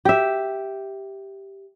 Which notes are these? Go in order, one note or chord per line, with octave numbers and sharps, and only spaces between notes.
G4 E5